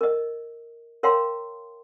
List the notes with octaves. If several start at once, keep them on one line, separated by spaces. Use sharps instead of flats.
A#4 D#5
A#4 C#5 F5 G5 A#5 C6